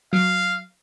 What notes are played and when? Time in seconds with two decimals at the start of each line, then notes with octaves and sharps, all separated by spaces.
0.13 F#3 F5